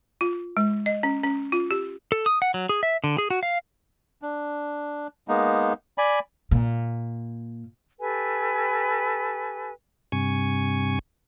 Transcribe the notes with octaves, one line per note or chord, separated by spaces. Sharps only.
F4
G#3
D#5
C#4
C#4
F4
G4
A4
D#6
F#5
F#3
G#4
E5
D3
G#4
F#4
F5
D4
G#3 A#3 B3 D#4
D5 G#5 B5
A#2
G4 A4 B4 G#5
G2 C3 G#5 C#6